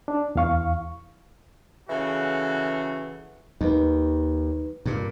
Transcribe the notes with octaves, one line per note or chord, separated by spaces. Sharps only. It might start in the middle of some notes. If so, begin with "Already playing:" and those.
D4
E2 E3 F5 C#6
C#3 E3 F#4 A4
D#2 D#4 B4
G2 A#2